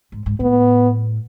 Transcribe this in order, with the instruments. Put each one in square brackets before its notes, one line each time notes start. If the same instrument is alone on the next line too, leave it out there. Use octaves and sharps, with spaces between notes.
[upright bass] G#2
G#2
[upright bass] A2 [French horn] B3